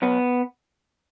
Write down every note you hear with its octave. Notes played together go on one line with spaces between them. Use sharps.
B1 B3